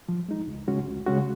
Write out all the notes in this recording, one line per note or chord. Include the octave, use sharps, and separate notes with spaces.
F3
G#3 D#4
C#2
C#3 G#3 C#4 F#4
C#2
C#3 G#3 C#4 F#4